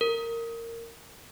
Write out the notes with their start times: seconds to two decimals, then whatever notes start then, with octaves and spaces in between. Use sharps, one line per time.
0.01 A#4